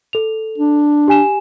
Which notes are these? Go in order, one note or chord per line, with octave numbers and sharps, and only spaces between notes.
A4 F7
D4
G4 G#5 E7